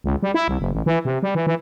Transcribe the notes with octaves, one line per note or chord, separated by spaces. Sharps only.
C#2
G3
E4
C2
F#1
A1
E3
C3
G3
E3
E3